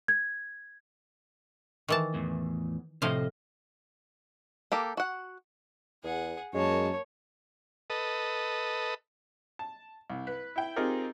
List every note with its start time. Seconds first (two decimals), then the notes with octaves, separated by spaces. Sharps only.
0.08 G#6
1.89 D#3 E3 A5
2.14 E2 A2
3.02 A2 C3 F3 D#5 F5
4.72 A#3 G4 A4
4.97 F#4 F#5
6.04 E2 G#4 F#5
6.54 F#2 G#3 A#3 C#5 A5
7.90 A4 B4 D#5
9.59 A5
10.10 C2
10.27 B4
10.56 E4 G5
10.76 C4 D#4 F4 G4 G#4 A#4